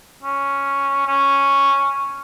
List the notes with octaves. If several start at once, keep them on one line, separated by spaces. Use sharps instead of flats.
C#4
C#4